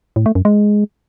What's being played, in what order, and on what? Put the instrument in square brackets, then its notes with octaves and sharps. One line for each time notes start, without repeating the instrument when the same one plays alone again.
[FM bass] A2
A3
F#2
G#3